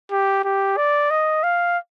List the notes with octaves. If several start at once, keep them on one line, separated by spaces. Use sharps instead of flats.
G4
G4
D5
D#5
F5